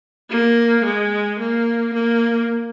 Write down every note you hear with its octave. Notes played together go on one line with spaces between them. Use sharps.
A#3
G#3
A#3
A#3